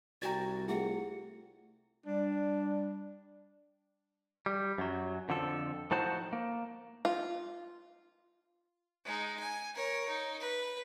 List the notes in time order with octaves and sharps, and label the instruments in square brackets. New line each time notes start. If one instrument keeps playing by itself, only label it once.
[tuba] C2 [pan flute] F#4 [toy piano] D5 G#5 A#5 [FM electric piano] G5 A6
[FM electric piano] A3 F4 G4 [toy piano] E4 G#4 E5 [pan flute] F#5
[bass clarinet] G3 [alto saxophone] D4
[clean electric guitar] G3
F#2 F#3
F2 D3 F3 A4
A2 F3 D#4 F#4 C5 A5
A#3
[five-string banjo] F4
[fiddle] G#3 D#4
G#5
A#4 C#5
D#4
B4